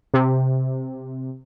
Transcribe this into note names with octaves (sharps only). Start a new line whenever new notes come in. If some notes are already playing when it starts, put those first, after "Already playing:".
C3